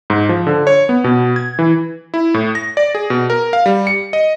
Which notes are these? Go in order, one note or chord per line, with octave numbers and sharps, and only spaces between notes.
G#2
F3
D3
C#5
B3
B2
G#6
E3
E4
A2
A#6
D5
G#4
B2
A#4
F5
G3
C#7
D#5